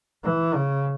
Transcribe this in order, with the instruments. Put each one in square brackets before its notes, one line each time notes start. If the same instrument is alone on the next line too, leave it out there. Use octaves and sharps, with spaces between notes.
[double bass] E3
C#3